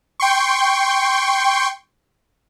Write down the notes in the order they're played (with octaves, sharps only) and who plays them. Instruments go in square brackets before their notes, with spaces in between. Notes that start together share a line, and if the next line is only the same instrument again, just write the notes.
[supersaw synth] G5 C6 C#6